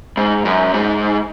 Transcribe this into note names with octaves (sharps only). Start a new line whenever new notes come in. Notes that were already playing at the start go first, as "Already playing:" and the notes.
G#2
F#2
G#2